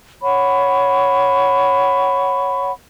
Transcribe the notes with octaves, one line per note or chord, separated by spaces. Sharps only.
C#5 F#5 B5 C#6